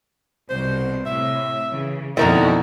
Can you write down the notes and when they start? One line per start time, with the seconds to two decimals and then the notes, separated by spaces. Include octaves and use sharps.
0.50 C2 B2 C5
1.06 A2 C3 E5
1.70 C#3 E3
2.17 F2 B2 D3 D#3 A#3 E4 F#4 A#4